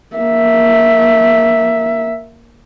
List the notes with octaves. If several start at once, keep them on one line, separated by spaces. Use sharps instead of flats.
A#3 E5